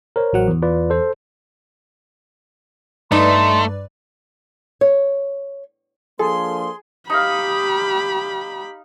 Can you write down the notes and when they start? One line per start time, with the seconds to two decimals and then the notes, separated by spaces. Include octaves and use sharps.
0.16 A#4 C5 C#5
0.33 A1 F#3 F#5
0.48 E2
0.62 F4 B4 D5
0.90 A4 C5
3.12 G2 A3 D#4 B4 D5 C6
4.81 C#5
6.19 F3 A#3 D4 G#4 A4 C6
7.10 D#4 G4 F5 B5